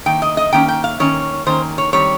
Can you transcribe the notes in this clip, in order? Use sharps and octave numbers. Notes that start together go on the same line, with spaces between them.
D#3 A#3 G5
D#5
D#5
D#3 A#3 C#4 G5
G5
F5
D#3 A#3 C#4 C#5
D#3 A#3 C#4 C5
C#5
D#3 G3 C4 C#5